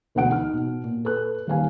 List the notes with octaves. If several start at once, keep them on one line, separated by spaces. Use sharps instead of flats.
E1 D2 B2 F#5 D7
D#4 F6
B2
A#2
A4 B4 F#6
D#1 D#2 F5 G#5